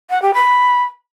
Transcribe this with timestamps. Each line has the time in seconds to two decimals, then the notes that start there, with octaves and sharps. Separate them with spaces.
0.10 F#5
0.22 G4
0.34 B5